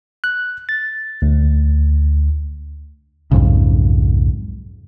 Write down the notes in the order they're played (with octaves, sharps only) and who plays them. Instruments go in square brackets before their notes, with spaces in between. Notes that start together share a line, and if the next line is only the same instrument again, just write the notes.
[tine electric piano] F#6
A6
D2
[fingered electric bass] B1 F2 G#2 C#3